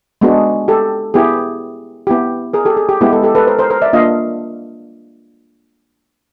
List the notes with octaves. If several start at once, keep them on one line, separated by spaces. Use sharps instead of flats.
G#3 B3 D4 F#4
G4 A4
B3 E4 G4 G#4
B3 E4 G4
G#4 A#4
G4 A4
G#4
G4
G#3 B3 E4 G4
G4 A4
G4 A4
A4 B4
A#4 C5
A#4 C5
A#4 C5
D5 E5
A#3 D4 F4 D#5 F5